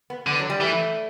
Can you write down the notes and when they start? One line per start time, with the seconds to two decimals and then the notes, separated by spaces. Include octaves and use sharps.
0.10 B3
0.27 D3 B3
0.39 F#3
0.50 G3
0.61 E3 A3